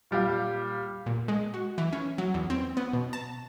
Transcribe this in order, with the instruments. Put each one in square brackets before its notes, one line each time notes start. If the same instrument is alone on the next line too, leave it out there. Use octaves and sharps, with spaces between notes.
[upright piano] A#2 G3 G4 F5
[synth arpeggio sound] A#2
G#3
F#4
E3
C#4
F#3
E2
C4
B3
B2
A5